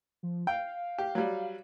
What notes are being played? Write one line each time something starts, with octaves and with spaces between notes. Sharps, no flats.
F3
F5 G5
G4
F#3 G3